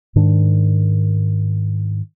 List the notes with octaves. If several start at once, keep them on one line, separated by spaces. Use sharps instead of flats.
G#2 D#3 D4